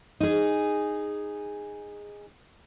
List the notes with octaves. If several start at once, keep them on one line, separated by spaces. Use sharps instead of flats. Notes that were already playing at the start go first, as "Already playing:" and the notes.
D#4 G#4